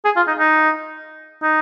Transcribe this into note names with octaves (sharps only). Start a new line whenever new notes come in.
G#4
F4
D#4
D#4
D#4